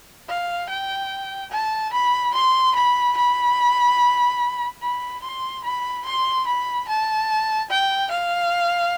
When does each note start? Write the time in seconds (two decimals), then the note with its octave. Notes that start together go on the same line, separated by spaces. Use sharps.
0.29 F5
0.69 G5
1.51 A5
1.93 B5
2.34 C6
2.75 B5
3.17 B5
4.82 B5
5.23 C6
5.64 B5
6.06 C6
6.46 B5
6.88 A5
7.70 G5
8.11 F5